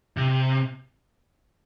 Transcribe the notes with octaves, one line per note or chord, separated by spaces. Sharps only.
C3